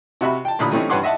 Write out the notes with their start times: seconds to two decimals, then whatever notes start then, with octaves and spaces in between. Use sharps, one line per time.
0.21 C3 F#4 E5 B5
0.45 G5 A5
0.59 A1 A#2 D3 B5 D#6
0.71 E3 G3 A3 C4 C#4 D#4
0.90 G2 B4 C#5 F#5 C6 D6
1.03 D#5 E5 F#5 A5